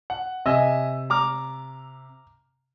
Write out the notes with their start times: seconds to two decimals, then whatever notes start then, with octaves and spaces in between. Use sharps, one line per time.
0.10 F#5
0.46 C3 D#5 E5 G#5 E6
1.10 A#5 D6 F6